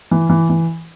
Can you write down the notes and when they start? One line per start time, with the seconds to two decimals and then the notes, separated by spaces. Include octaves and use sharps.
0.11 E3
0.30 E3
0.50 E3